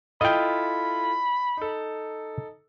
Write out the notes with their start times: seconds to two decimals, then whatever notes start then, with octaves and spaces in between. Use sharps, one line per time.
0.21 E4 F4 A4 D#5 G5 B5
1.57 D#4 A4